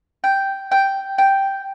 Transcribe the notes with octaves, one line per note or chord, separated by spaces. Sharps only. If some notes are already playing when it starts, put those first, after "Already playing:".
G5
G5
G5